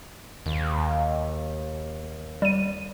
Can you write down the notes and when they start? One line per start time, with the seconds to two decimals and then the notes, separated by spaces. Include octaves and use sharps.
0.46 D#2
2.42 G3 D#7